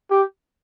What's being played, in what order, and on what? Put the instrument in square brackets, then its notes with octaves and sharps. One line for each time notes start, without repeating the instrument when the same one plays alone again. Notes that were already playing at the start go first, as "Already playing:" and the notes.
[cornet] G4